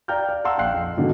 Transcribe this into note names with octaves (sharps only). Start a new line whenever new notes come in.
D5 F5 G5 A#5 F6 G6
D5
F5 F#5 A5 A#5 C6 E6
A#1 F5 G5 F#6 C7
F2
G#2 B2 D3 F#3